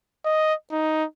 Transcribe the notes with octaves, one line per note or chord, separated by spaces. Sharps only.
D#5
D#4